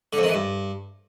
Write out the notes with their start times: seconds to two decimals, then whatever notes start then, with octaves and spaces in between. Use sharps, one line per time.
0.13 D3
0.18 F2
0.23 D#3
0.28 E3
0.34 G2